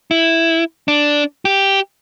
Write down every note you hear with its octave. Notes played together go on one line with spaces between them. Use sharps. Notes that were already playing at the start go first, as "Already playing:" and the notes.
E4
D4
G4